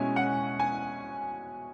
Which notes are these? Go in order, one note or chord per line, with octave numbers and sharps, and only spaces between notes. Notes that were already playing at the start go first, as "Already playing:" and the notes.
Already playing: B2 G#3 C#4 E4 G#5
F#5
G#5